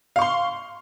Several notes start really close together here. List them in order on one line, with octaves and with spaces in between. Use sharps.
F5 C#6 C6